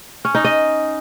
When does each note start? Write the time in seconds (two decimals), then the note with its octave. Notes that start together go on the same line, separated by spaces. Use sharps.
0.25 C#4
0.35 D#4
0.45 D#5